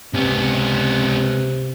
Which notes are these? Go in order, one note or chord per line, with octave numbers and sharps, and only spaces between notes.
C#2 C3 B3